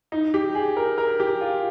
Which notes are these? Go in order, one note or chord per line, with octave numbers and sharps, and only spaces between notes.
D#4
G4
G#4
A#4
A#4
G4
F4